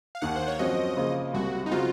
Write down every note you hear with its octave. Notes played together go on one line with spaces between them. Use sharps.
F5
D#2 D#3 A#3 F#5
C5
C#5
F#2 F3 C4 F#4 D#5
C#3 F3 A#3
C2 C3 F#3 F#4
D#4
C#3 F#3 C4 F4 F#4